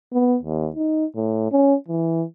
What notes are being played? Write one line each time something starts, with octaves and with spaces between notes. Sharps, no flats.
B3
D#2
D#4
A2
C#4
E3